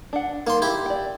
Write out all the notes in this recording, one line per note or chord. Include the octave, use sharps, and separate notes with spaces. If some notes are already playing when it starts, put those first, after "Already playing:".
D4 F#5
D#3 A#3 C6
E4 G4
D5 G5